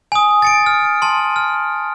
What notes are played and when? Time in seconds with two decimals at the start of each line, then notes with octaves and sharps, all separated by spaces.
0.12 G#5 D#6
0.42 A6 C#7 D7
0.66 F6
1.02 A5 C6
1.36 F6